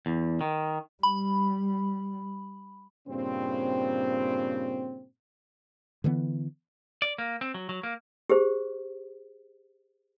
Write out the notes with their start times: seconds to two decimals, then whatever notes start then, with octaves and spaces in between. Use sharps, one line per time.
0.06 E2
0.41 D#3
1.03 G3 B5
3.08 G2 A#2 C#3 C4
6.04 D3 E3 G3 B3
7.02 D5
7.18 A#3
7.41 C4
7.54 F#3
7.69 F#3
7.83 A#3
8.30 G4 G#4 C5